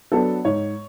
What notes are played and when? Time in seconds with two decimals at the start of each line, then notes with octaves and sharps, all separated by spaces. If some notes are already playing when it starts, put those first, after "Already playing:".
0.12 F#3 B3 D4 A4
0.45 G#2 C#5